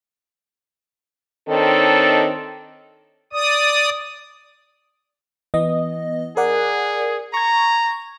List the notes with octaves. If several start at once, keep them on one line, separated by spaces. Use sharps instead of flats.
D#3 C4 D4 D#4 A4 C#5
D5 D#6
E3 B3 D#5
G#4 A#4 D5 F#5
A#5 C#6 G#6